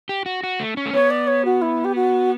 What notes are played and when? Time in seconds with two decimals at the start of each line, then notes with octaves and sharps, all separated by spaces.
0.09 G4
0.26 F#4
0.43 F#4
0.60 A3
0.77 C#4
0.86 A3
0.93 B3 C#5
1.10 D5
1.27 C#5
1.45 F#4
1.62 E4
1.84 G4
1.95 F#4